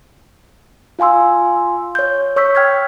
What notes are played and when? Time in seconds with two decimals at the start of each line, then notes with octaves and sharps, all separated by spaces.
0.99 F4 F5 G#5 C6 E6
1.95 C#5 G6
2.36 C#5 C#6 E6 G6 B6
2.55 G5 F6 G#6 B6